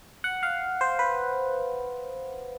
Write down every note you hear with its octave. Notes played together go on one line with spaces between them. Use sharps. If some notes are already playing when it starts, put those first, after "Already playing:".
F#5
F5
C5
B4